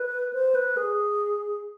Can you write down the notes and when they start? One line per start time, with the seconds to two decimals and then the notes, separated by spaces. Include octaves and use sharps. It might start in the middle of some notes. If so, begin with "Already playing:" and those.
Already playing: B4
0.33 C5
0.55 B4
0.77 G#4